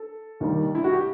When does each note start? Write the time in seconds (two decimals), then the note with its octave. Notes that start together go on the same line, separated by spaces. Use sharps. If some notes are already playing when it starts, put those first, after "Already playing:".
Already playing: A4
0.40 D#2 D#3 G3
0.75 E4
0.84 F#4
0.93 G4